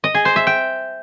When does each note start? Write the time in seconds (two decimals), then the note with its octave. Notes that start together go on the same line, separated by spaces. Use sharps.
0.04 D#5
0.15 G#4
0.25 C5
0.36 E5
0.47 G5